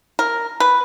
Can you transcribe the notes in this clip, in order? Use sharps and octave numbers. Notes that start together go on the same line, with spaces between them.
A#4
B4